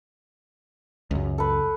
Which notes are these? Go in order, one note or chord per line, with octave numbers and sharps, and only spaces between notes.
C#2 F#2
A4 B4